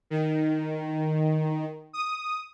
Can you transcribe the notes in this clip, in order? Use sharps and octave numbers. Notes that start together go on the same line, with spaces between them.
D#3
D#6